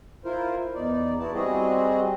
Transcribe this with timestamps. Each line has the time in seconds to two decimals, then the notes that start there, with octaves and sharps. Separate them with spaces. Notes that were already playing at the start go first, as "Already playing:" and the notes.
0.25 E4 F4 A#4 C5
0.75 E2 D#4 D5
1.19 B3 E4 F#4 A5
1.34 G3 C4 F#4 G#4 D#5